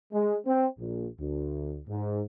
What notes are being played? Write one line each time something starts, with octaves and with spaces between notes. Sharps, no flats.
G#3
C4
A#1
D2
G#2